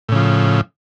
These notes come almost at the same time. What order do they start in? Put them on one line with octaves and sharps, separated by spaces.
A2 C#3 F3